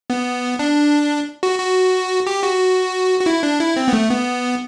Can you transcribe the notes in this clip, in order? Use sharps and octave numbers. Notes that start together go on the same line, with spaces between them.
B3
D4
F#4
F#4
G4
F#4
F#4
E4
D4
E4
C4
B3
A3
B3